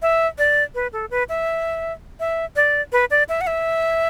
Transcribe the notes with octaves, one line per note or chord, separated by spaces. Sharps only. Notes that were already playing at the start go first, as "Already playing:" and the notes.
E5
D5
B4
A4
B4
E5
E5
D5
B4
D5
E5
F#5
E5